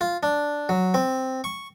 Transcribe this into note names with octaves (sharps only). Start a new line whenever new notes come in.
F4
D4
F#3
C4
C#6